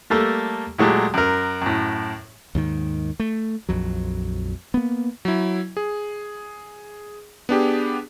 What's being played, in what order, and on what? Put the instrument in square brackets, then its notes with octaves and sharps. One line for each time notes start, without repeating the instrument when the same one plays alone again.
[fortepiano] G3 A3 A#3 A4
A#2 F#3 G#3 A3 G4
F#2 A#4
F#2 A2
[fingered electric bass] D#2 G#2 D#3
A3
A#1 F2 F#3
A#3 B3
[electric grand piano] F#3 E4
G#4
B3 D4 G4 G#4